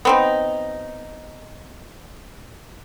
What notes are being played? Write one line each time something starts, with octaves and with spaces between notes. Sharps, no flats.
B3 C4 D#4